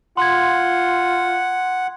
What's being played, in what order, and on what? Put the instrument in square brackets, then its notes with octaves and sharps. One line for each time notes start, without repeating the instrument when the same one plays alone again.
[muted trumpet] F4 [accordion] F#5 [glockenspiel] C6 G#6